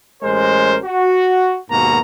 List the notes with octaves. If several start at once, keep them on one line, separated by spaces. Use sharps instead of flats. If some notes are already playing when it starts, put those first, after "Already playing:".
A1 G#3 C#4 A#4 C5
F#4
D#2 G#2 B2 A#3 F#4 A#5